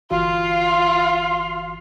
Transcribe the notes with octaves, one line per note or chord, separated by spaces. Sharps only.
G1 E3 F4 F#4 F5 C6